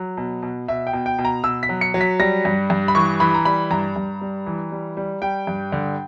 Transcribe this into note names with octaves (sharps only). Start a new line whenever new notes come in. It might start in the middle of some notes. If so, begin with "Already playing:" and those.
Already playing: F#3
B2
B2
B2 E5
G5
B2
G5
B2
A#5
B2 E6
B6
F#3
C#7
F#3
B6
G3 A#6
G2
G2
B5
E3 C#6
E3 B5
A#5
G3 B5
G2 A#5
G2
G3
E3
G3
G3
G3 G5
G2
D3